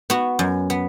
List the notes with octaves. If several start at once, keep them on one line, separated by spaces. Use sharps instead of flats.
B3 F#4
F#2
B3